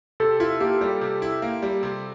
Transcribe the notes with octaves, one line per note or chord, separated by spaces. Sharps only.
C3 A4
E4 F4
A#3 G4
G3 G4
C3
E4
A#3
G3
C3